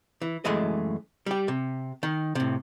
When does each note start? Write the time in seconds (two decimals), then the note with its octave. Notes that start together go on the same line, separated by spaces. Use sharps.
0.21 E3
0.45 F#2 E3 G#3 A3 D#5
1.26 G3 G4
1.48 C3
2.03 D#3
2.35 A2 C3